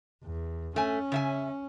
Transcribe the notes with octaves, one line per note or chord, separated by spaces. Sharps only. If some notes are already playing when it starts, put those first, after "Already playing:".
E2
A3 C#4 G#5
C#3 E5 G#5